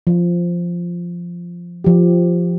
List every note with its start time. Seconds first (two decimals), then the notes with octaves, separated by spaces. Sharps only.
0.07 F3
1.84 F3 G4